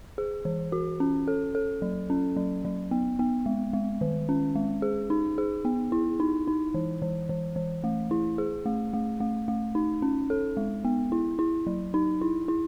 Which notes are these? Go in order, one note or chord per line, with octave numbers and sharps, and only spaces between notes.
G#4
E3
F#4
C#4
A4
A4
F#3
C#4
F#3
F#3
B3
B3
G#3
G#3
D#3
C#4
G#3
G#4
D#4
G#4
B3
E4
D#4
D#4
E3
E3
E3
E3
A3
E4
G#4
A3
A3
A3
A3
D#4
C#4
A4
G#3
B3
E4
E4
F#3
D#4
E4
E4